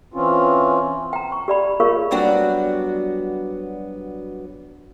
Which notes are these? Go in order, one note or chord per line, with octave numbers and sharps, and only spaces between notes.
E3 C4 C#4 F4
G5 A#5
C#6
G4 D5 B5
F4 G#4 A#4 C#5 F5 C#6
F#3 G3 B3 D4 F#4